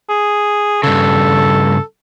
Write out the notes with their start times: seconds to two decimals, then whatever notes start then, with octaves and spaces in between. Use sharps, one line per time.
0.09 G#4
0.83 G2 C#3 A4